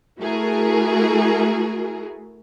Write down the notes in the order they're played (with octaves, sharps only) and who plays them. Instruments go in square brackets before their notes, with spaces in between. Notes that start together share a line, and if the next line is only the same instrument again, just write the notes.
[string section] A3 E4 F#4 G#4 A#4